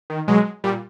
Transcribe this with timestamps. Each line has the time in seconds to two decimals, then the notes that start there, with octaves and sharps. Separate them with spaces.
0.10 D#3
0.28 B2 F#3 G#3
0.64 A#2 G3